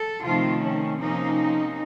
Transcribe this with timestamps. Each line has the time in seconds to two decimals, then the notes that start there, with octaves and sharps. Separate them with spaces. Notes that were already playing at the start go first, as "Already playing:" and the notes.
Already playing: A4
0.23 C3 D#3 F3 A3 C4 F4
0.62 C#4
0.99 C3 F3 A#3 C#4 D#4